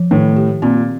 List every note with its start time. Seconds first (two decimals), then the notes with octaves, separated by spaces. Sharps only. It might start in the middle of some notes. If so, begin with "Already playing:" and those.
Already playing: F3
0.11 A2 D#3
0.36 G4
0.62 A#2 C4